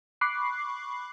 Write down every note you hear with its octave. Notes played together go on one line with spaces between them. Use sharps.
B5 C#6 D6 F#6 C7